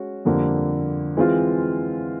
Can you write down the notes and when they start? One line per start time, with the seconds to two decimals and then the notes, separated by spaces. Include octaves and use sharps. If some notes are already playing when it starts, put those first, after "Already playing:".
Already playing: G#3 C#4 F#4
0.25 F2 D3 G3 A#3
1.17 E3 G#3 C4 F4